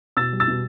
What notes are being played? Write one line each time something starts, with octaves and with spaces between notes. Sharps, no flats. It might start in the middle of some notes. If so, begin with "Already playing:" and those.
B2 E6 A6
G3
E6 A6
B2